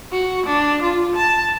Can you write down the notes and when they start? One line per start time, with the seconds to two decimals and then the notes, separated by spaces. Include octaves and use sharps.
0.12 F#4
0.47 D4
0.83 F4
1.16 A5